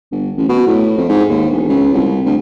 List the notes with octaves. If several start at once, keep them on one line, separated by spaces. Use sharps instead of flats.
G1
A1
B2
A2
F2
G#2
D#2
E1
C#2
C2
D2